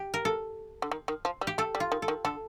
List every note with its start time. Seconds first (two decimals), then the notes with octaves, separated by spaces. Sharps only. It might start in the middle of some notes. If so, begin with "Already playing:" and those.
Already playing: G4
0.14 A#4
0.25 A4
0.82 D3
0.92 D#3
1.08 D#3
1.25 F3
1.41 G3
1.47 G4
1.58 A3 A4
1.75 G3
1.80 F4
1.92 D#3
2.02 A4
2.08 D#3
2.25 D3 A4